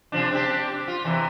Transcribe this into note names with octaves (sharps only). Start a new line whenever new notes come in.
C3 F3 D4
C4 D4 G4
F4
E2 C3 E3